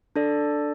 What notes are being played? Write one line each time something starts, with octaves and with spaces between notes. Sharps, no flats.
D4 A4 D5